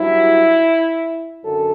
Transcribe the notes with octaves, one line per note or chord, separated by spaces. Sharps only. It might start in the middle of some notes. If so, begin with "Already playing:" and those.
Already playing: G2 F#3 E4
F#2 D3 A4